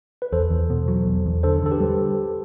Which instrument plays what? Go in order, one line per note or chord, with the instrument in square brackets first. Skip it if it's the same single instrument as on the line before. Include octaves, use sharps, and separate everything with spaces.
[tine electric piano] B4
[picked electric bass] E2 [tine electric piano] A4 C5
[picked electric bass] E2
B2
F#3
E2
E2
[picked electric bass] D3 [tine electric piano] A4 C5
[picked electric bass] D3 [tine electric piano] A4
[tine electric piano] G4 B4
[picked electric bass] G3